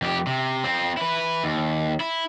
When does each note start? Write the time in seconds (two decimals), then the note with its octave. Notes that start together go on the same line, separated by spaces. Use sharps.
0.02 F2 G4
0.27 C3
0.64 C4 F4
0.97 E4 B4
1.44 D#2
2.00 E4